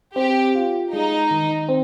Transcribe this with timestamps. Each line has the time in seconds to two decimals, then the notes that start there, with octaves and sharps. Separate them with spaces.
0.16 C4 G4
0.55 F4
0.93 G#3 D#4
1.31 D#3
1.69 C4